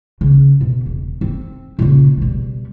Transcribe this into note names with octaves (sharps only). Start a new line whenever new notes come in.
C#3
B2
E1
C4
A#2 C#3
B2 G3